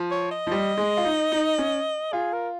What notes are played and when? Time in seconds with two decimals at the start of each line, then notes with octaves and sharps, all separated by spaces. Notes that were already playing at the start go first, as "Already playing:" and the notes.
Already playing: F3
0.11 C#5
0.31 D#5
0.47 F3
0.51 G3
0.77 G#3
0.97 F4
1.05 D#4
1.32 D#4
1.58 C#4
2.12 F4 G#4
2.33 A#4